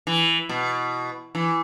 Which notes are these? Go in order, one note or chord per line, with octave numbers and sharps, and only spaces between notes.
E3
B2
E3